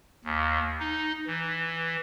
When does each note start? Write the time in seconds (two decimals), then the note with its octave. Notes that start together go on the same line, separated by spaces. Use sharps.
0.25 D#2
0.80 D#4
1.27 E3